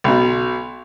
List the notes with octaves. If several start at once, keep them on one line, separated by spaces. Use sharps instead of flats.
B1 B2